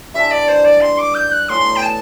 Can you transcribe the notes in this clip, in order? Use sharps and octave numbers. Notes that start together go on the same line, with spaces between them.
G2 E3 G3 D4 E5
D5
C5
D5
C6
D6
G6
F#6
A2 E3 B3 F#4 C6
G5
A5